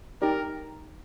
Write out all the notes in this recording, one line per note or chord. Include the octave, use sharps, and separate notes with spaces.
D#4 G4 A#4 D5